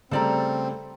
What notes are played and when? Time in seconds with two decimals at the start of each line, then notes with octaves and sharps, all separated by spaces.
0.11 C#3 G3 A3 C4 A4 D5 A#5